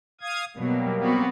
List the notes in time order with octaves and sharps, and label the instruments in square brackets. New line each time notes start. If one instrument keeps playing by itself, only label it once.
[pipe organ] F5 D#6 G#6
[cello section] B2 F#3 [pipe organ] G3 A#3
[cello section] B3 C4 F#4